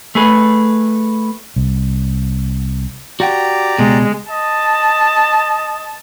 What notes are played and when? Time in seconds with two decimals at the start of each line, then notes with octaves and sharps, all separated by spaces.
0.15 A3 G#4 B4
1.56 C2
3.20 F#4 G4 D5 F#5 G5 A#5
3.79 C#2 B2 G#3
4.30 D#5 A5